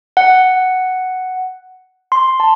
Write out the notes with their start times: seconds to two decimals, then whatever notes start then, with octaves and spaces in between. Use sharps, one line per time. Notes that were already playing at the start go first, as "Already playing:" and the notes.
0.17 F#5
2.12 C6
2.40 A5